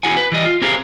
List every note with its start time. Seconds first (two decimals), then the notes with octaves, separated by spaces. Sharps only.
0.03 E2 E4 F#4 G#4 F#5 G#5
0.17 B4
0.32 E3 G3 D#5
0.45 F4
0.62 C4 G4 G#4 A#4 C5 F5